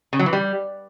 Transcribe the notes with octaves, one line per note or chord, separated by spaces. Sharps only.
C#3
F#3
E3
G3